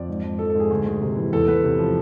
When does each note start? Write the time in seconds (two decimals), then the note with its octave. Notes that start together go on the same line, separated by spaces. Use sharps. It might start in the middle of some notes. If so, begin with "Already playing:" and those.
Already playing: F2 D5
0.09 G#2
0.24 F3
0.39 F3 A4
0.50 A4
0.55 G#2
0.60 G#4
0.70 D2
0.86 D2
1.02 C3
1.17 E3
1.33 E2 A4
1.48 E2 B4
1.64 C3
1.79 F3